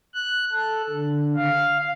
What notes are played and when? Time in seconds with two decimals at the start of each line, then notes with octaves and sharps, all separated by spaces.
0.14 F#6
0.53 A4
0.89 D3
1.36 F5